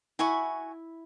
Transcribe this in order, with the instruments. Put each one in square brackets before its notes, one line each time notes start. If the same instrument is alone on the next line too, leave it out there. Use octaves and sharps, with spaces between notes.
[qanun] E4 [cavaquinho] F#4 G#5 C#6